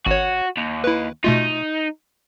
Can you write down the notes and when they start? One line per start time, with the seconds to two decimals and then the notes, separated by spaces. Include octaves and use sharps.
0.07 G#1 F#4 C#5
0.57 D#2
0.84 E4 B4
1.24 B2 A3 D#4 F4